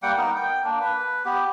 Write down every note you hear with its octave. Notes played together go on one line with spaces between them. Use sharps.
G3 A#3 F#5 G5
B3 D#4 A#4
G5
A#3 D4
B4
B3 G4